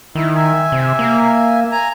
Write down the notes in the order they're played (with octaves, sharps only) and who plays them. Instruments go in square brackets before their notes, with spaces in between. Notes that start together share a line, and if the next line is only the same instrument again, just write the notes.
[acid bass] D#3 [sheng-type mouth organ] E4
[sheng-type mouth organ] E5 G#5
[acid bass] C3
A#3
[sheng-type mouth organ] G#5 A#5